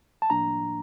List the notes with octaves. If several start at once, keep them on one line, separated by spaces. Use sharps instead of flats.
A5
A2 F3 A#3 D4 A#5